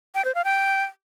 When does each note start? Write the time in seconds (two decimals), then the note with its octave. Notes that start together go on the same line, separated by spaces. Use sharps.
0.15 G5
0.25 C5
0.35 F5
0.45 G5